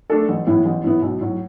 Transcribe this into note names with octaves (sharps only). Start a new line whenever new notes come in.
A3 D4 A4
A1
A2 E3 B3 E4
A1
A2 E3 B3 E4
B1
A2 F#3